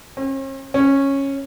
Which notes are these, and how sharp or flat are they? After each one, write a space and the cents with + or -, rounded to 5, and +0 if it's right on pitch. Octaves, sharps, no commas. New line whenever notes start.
C#4 -45
C#4 -10